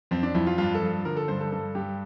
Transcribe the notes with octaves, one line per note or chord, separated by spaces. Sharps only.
F2 C4
D4
F2 E4
F4
G2 F4
A4
F3
D3 A#4
A4
G2 C5
A4
G2 A4
G2 G4